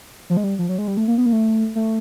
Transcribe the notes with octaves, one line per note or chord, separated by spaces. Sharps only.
F3
G#3
G3
F3
F#3
G#3
G3
A3
A#3
B3
A#3
A3
A3